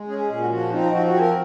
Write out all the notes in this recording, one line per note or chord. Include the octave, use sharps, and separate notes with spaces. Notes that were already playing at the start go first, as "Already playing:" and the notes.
Already playing: G#3
C#4 G#4
G#4
A#2 G#4
F#4
F3 F#4
C4 D#4
F3 F#4
F#4
C4 G#4
A#4